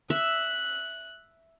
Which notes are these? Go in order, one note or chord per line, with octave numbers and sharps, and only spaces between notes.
E5 F#6